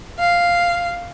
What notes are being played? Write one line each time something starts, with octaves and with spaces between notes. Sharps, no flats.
F5